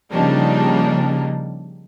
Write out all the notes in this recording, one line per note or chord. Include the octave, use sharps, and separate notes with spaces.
C#3 F3 G3 A#3 D4 D#4